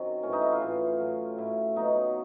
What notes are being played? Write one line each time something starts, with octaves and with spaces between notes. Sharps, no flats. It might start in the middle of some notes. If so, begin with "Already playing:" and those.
Already playing: F#2 D#3 F#3 C4
A2 E3 C#4
D#4
E4
F4
A2 E3
A2 F#3
A2 F#3 E4
B2 F#3 D#4